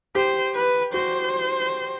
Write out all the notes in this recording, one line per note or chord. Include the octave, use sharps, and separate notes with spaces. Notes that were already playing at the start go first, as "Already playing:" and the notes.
G4 C5
B4
F#4 C5